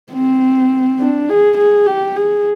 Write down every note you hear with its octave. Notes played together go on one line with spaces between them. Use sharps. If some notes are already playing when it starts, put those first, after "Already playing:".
C4
D4
G#4
G#4
G4
G#4